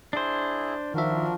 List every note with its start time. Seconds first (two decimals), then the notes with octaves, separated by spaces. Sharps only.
0.13 D4 E4 G#4 C5
0.94 D#3 F3 D4 F#4 A#4 E5